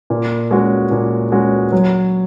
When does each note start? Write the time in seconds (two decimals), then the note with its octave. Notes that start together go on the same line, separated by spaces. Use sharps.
0.10 A#2
0.51 G#3 C#4 F#4
0.91 A#2
1.32 G#3 C#4 F#4
1.72 F#3